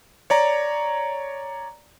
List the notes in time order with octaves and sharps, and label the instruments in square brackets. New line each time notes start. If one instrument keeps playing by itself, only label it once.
[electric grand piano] C#5 D5 A#5